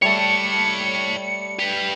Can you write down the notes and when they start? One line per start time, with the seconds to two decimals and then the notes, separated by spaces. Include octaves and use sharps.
0.02 G3 A3 C#5 A5 C#7
1.59 G4 B4